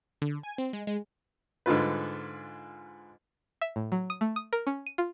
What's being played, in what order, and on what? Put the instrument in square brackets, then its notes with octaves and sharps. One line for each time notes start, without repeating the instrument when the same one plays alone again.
[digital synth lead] D3
G#5
C4
G#3
G#3
[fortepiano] G#2 D3 G#3 F4 B4
[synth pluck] E5
A2
F#3
D#6
A3
D#6
A#4
C#4
D#7
F4